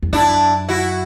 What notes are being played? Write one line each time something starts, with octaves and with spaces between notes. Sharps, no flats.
F2
F#2 D4 E4
E4 F#4